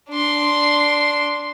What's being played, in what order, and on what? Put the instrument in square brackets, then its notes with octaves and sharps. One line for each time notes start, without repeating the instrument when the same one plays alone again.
[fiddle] D4 C6